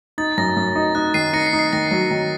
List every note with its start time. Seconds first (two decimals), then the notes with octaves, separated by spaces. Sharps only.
0.18 D#4 A6
0.37 F#2 A#6
0.56 F#2
0.75 D#4
0.95 D#4 F#6
1.14 D#3 C7 D#7
1.33 D#4 A#6 C#7
1.47 C7
1.53 D#4
1.59 C7
1.73 D#3 A#6
1.91 F#3
2.11 D#3